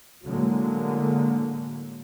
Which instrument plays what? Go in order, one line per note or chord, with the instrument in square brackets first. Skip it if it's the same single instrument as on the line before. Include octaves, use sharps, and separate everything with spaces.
[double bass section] A2 D3 F#3 G#3 A#3